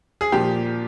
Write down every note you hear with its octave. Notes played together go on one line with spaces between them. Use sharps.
G#4
A#2 F3 G4